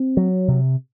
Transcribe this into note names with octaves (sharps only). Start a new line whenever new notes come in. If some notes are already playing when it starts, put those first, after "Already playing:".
Already playing: C4
F#3
C3